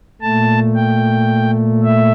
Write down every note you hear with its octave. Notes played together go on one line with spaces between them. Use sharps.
A#2 A3 A5
G5
E5